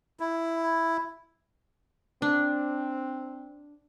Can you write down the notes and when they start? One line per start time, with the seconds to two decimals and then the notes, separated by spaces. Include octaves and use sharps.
0.20 E4
2.22 C4 D4